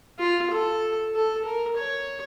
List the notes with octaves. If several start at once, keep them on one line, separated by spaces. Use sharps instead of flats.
F4
A4
A4
A#4
C#5